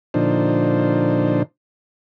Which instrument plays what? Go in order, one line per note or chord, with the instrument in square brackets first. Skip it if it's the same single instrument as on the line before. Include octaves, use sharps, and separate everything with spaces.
[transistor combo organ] A#2 D3 F3 D4 D#4 C5